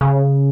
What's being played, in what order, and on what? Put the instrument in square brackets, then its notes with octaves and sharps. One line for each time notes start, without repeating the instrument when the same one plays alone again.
[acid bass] C#3